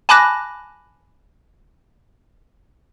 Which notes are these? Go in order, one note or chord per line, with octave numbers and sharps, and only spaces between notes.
G#5 A5 B5 D6 F#6 A#6